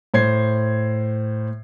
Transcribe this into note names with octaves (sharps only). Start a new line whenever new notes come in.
A2 C5 G#6 C7